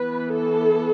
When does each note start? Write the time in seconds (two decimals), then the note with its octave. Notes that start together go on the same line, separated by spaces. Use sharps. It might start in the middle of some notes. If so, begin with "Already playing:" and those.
Already playing: E3 B3 B4
0.33 A4